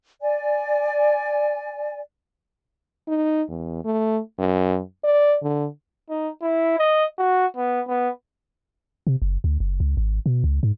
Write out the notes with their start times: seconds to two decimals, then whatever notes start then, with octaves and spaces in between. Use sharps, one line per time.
0.22 D5 G#5
3.08 D#4
3.49 E2
3.85 A3
4.39 F#2
5.04 D5
5.43 D3
6.10 D#4
6.42 E4
6.79 D#5
7.18 F#4
7.57 B3
7.88 B3
9.07 C3
9.22 F#1
9.44 D2
9.60 F#1
9.80 C#2
9.97 G#1
10.26 B2
10.44 C#2
10.63 G#2